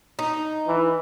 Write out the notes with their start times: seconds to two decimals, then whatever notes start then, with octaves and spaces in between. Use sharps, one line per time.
0.19 D#4
0.68 E3